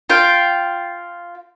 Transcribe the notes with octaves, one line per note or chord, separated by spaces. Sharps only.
F4 G5